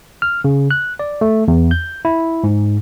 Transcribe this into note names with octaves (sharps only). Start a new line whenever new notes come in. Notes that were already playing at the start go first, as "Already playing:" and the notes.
F6
C#3
F#6
D5
A3
E2
G6
E4
G#2